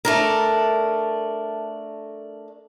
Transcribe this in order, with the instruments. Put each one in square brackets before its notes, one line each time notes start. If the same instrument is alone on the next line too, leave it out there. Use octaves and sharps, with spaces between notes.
[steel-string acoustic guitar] A3 D4 A#4